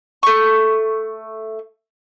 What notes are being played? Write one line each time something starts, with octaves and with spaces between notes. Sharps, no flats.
A3 C#6